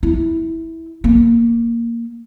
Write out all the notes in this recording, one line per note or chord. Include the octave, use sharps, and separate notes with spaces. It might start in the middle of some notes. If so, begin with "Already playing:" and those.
E4
A#3